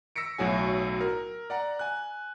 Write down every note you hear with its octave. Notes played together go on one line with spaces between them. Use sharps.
E6 A#6 B6 C#7 D7
B1 A2 F#3 F#4 G#5
A#4
D5 F#5 A#5
G#5 F#6